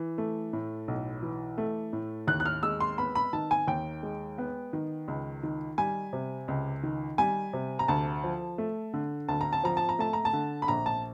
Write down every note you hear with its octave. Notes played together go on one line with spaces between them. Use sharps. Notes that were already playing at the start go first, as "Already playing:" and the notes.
Already playing: E3
A3
A2
B1
E3
A3
A2
D#2 F#6
F#6
F6
G#3 E6
C6
B3 B5
B5
D#3 A5
G#5
D#2 G5
G#3
B3
D#3
C#2
D#3
G3 G#5
C3
C#2
D#3
G3 G#5
C3
A#5
D2 A5
F3
A3
D3
D2 A5
A#5
A5
F3 A#5
A5
A#5
A3 A5
A#5
A5
D3
B5
A#1 A#5
A5